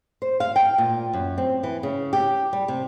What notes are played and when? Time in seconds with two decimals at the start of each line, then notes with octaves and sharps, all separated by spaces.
0.22 C5
0.40 F5
0.56 G5
0.78 A#2
1.13 F#2
1.38 C4
1.63 E3
1.83 C#3
2.13 G4
2.53 G3
2.68 C3